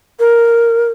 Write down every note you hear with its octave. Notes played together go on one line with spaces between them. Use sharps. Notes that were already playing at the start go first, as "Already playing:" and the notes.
A#4